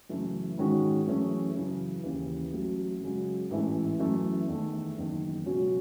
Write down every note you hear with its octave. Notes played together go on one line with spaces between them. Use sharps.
F#2 C#3 E3 A3 E4
G#2 D#3 G#3 C#4 F#4
F#2 E3 A3 C#4 G#4
F#2 C#3 E3
D#2 C#3 E3
A1 A2 F#3
F#2 C#3 G#3 C#4 F#4
A1 G#2 E3 A3 E4
F#2 E3 A3
E2 D#3 A3
F#1 E2 D#3
C#2 B2 F#3 C#4 F#4